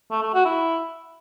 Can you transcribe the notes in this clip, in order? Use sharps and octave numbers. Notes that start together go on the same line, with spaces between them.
A3
A3
F#4
E4